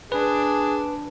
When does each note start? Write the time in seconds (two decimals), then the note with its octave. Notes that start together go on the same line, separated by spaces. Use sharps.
0.12 D4 G#4 B4